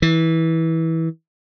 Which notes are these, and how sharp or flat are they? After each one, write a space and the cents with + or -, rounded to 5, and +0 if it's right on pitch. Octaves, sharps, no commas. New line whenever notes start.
E3 -20